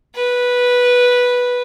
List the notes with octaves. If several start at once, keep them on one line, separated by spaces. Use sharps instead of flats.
B4